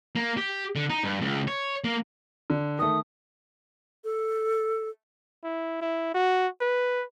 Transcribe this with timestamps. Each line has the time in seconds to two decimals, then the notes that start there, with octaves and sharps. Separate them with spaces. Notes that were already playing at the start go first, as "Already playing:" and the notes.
0.16 A#3
0.37 G4
0.76 D3
0.90 D#4
1.04 G2
1.21 C#2
1.48 C#5
1.84 A#3
2.50 D3
2.79 D#3 A3 D#6
4.04 A4
5.44 E4
5.82 E4
6.14 F#4
6.61 B4